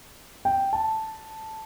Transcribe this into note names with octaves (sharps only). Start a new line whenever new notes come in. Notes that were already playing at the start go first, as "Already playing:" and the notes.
G5
A5